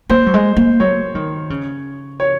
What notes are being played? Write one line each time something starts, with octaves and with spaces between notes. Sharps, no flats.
A#3 C5
F#3
G#3
A#3
F#3 C#5
D#3
C#3
C#5